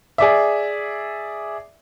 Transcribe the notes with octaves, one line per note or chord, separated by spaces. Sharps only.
G#4 D5 E5